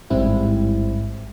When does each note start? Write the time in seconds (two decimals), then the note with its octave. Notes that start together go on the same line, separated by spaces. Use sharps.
0.10 A1 G#2 G3 C4 E4